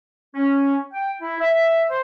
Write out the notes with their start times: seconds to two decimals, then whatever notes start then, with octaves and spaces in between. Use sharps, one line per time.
0.34 C#4
0.92 G5
1.21 E4
1.40 E5
1.89 C5